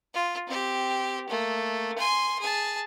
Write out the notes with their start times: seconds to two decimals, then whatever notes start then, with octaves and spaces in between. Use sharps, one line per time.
0.14 F4
0.47 C4 G4
1.29 A3 A#3
1.98 G#5 C6
2.40 G#4 A5